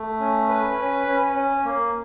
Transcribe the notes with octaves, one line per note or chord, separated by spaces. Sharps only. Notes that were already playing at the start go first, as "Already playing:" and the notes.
Already playing: A3
C#4
B4
C#4
C#4
C#4
A#3